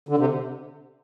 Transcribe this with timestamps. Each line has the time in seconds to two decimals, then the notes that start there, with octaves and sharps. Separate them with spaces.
0.09 D3
0.18 C3